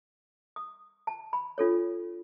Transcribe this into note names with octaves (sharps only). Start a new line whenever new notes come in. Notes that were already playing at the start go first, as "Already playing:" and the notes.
D#6
A5
B5
D4 F4 A4 C#5